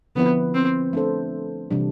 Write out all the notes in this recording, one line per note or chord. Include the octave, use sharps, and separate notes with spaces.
D3 F3 B3 C4 E4 B4
C4
A3 D4 A4 C5
C3 E3 G3 D4